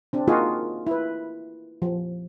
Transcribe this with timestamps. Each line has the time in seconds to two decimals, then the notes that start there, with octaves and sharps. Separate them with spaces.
0.13 C4 D4
0.28 A#3 D#4 F4 F#4 G#4
0.87 E4 B4
1.82 F3